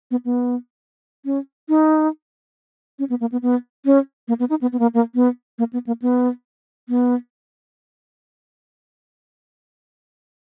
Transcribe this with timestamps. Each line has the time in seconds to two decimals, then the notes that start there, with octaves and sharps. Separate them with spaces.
0.11 B3
0.25 B3
1.25 C#4
1.69 D#4
2.99 C#4
3.10 B3
3.21 A#3
3.32 B3
3.42 B3
3.85 C#4
4.28 A#3
4.40 B3
4.50 D#4
4.61 B3
4.73 B3
4.79 A#3
4.94 A#3
5.15 B3
5.59 A#3
5.73 B3
5.87 A#3
6.02 B3
6.89 B3